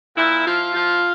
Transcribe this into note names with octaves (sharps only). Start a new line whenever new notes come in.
A#2 E4
F3 F4
F3 F4